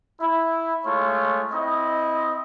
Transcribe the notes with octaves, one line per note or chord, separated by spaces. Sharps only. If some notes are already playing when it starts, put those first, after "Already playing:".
E4
G#3 A3 F4 C#5
C4 E4 D#5